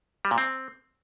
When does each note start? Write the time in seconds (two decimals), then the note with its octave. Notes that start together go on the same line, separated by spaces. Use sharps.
0.25 G3
0.31 A#2
0.38 C4